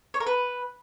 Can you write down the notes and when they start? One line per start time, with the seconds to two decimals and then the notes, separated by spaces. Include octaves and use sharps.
0.14 C#5
0.20 A#4
0.27 B4